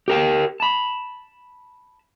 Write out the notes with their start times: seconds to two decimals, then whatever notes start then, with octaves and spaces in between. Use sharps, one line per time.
0.08 G4 A#4 G5
0.60 A5 B5